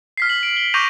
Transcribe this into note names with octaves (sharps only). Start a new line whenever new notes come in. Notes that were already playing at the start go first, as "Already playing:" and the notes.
F6 B6 C7
F#7
D7
G7
C#6 D6 G6 A#6 D#7 F7